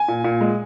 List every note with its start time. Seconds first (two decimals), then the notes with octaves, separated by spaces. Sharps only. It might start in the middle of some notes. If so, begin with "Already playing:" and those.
Already playing: G#5
0.08 A#2
0.24 A#2
0.41 G#3